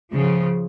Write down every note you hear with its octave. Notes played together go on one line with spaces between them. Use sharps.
C#3 F3